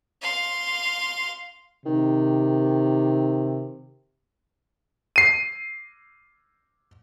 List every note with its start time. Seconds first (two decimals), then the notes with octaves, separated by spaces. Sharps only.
0.22 F5 C6
1.86 C3 D#3
5.16 C7 D#7